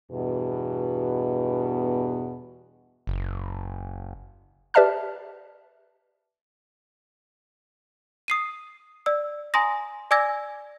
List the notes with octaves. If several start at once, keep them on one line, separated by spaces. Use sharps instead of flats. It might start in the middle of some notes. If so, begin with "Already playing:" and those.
E2 G2 B2
F#1
G4 B4 D5 E5 A5 F6
D#6 C7 D#7
D5 E6
G#5 A#5 C6 D#6 A#6
D5 G#5 D6 E6 G#6 A#6